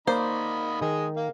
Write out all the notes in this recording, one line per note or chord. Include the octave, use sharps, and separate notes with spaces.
D#3 A#3 C5 D5 D#5 B5
D#3 G#3 D#5 G#5
A#3 F5